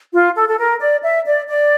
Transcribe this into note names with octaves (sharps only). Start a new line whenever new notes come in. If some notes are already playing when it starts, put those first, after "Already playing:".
F4
A4
A4
A#4
D5
E5
D5
D5